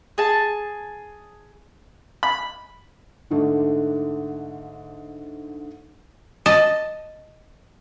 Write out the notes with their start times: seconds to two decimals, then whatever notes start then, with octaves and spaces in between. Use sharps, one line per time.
0.18 G#4 A5
2.23 B5
3.30 G#2 D3 A3
6.46 D#5 A5